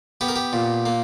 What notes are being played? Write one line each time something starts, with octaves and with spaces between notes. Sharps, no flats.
B3 G4
A#4
G4
A#2
A#3